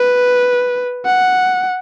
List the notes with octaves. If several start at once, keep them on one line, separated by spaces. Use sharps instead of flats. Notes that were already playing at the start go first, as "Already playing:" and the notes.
Already playing: B4
F#5